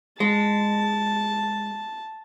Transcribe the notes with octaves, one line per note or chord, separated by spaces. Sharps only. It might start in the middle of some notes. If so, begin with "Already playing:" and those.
G#3 A5